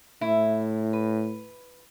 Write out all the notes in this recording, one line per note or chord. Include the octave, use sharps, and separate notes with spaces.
A2 E4
B4